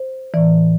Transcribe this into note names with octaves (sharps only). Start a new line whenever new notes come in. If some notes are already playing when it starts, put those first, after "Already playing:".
Already playing: C5
A2 E3 D5